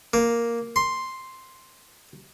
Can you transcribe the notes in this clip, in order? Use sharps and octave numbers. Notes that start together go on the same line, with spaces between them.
A#3
C6